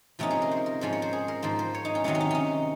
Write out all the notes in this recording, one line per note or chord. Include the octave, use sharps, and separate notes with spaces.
C3 F3 A#3 C#4 D#4
G#4
A#4
C5
A#4
G#2 F3 G#3 C#4 C5
C#5
C5
G#4
A#4
G#2 F3 A#3 C5
C5
C#5
D#4
C#4
C3 D#3 F#3 C4 D#4
C#4
D#4
C#4 D#4